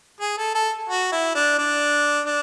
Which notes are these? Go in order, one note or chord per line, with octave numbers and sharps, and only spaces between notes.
G#4
A4
A4
F#4
E4
D4
D4
D4